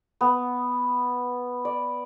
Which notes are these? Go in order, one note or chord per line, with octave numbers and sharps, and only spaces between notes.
B3
D5